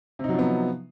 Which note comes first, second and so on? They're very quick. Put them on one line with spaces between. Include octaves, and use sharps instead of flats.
C3 D#4 F#3 F3 B3